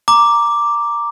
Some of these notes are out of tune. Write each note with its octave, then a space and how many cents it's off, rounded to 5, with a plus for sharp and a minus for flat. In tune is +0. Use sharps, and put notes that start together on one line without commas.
A#5 +0 D6 +0